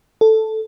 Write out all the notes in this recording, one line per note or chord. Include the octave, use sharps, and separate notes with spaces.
A4